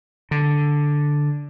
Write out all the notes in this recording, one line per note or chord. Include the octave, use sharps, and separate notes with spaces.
D3